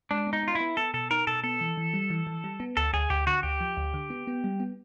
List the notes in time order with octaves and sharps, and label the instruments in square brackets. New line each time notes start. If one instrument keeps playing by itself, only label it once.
[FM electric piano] G#3 [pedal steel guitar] D4
[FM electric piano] B3
[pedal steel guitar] D#4
[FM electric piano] B3 [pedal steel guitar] F4
[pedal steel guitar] E4
[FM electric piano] B3
[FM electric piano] B3 [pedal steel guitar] A4
[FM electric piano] B2 [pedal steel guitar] A4
[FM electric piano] D#4 [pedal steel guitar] A#4
[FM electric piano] B2 [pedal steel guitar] A4
[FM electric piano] B3 [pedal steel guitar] A4
[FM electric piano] E3
E3
G3
E3
E3
G3
B3
[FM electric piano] D2 [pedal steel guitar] A4
[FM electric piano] D2 [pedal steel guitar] G#4
[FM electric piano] D2 [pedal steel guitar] G4
[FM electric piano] D3 [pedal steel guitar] F#4
[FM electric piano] D2 [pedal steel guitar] G4
[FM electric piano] F3
D2
D3
B3
B3
G3
B3